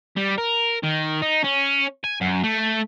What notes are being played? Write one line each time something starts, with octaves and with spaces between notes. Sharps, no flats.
G3
A#4
D#3
D#4
C#4
G#5
F#2
A3